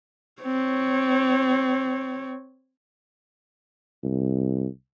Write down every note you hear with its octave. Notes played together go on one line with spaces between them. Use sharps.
C4 C#5
C2